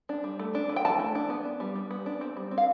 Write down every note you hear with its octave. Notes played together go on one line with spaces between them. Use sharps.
D4
G3
A3
D4
E3
G5
E3 A5
A3
D4
B3
D4
G3
G3
B3
D4
C4
G3
C4
F5